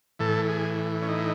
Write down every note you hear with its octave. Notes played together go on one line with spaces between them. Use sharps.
A2 E3 A4
G#4
C#4
D#4